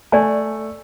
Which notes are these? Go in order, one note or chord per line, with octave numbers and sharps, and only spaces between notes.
A3 D5 G#5 A5